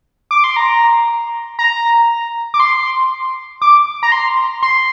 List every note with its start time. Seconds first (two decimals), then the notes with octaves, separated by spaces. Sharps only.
0.31 D6
0.44 C6
0.56 A#5
1.59 A#5
2.54 D6
2.60 C6
3.62 D6
4.03 A#5
4.12 C6
4.62 C6